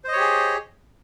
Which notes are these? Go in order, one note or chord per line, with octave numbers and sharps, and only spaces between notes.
G4 G#4 C5 C#5 D#5